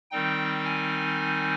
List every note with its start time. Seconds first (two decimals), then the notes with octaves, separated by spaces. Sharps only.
0.11 D#3 G3 C4 D#4 G5
0.65 G#5